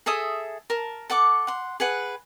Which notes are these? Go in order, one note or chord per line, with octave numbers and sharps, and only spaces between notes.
G#4 A4 E5 D#6
A#4 A5
A4 F#5 C#6 D6
F#5 C6
G#4 B4 F#5